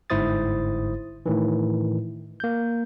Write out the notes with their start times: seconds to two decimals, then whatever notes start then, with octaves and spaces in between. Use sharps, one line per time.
0.10 G1 G#2 E4 C5 D#6 A6
1.26 A2 D#3 E3
2.40 A#3 G6